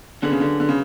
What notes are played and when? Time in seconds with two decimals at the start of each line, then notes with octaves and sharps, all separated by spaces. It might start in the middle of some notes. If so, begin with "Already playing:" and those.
0.22 D3 F#3 C#4 G#4 B4
0.32 C#3
0.40 D3
0.60 D3
0.69 C#3